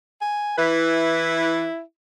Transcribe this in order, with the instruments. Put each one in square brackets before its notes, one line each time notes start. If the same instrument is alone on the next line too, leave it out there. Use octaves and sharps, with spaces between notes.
[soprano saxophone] G#5
[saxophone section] E3 B4 [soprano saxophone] E4